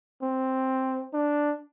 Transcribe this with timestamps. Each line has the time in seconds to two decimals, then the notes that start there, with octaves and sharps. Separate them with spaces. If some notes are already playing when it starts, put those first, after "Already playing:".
0.22 C4
1.13 D4